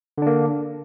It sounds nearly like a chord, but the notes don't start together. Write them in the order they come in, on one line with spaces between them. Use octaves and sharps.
D3 D4 A#3